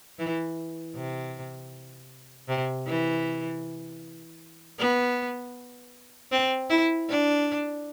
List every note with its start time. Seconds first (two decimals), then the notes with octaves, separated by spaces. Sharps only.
0.19 E3
0.95 C3
2.49 C3
2.87 E3
4.79 B3
6.32 C4
6.70 E4
7.09 D4